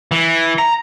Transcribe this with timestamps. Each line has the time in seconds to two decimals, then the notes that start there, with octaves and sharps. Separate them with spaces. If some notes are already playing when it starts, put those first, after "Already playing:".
0.12 E3
0.59 A#5